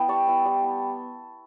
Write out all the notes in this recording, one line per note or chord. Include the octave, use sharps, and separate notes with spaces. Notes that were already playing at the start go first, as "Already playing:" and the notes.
Already playing: B3 E4 G5 B5
G3 A5 C#6
B3 E4
G3
B3